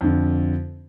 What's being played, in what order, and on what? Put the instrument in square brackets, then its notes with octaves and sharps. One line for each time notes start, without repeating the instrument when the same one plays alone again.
[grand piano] F2 D3